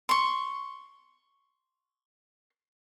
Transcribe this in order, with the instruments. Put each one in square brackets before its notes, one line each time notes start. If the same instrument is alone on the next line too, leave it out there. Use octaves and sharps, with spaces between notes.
[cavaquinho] C6 C#6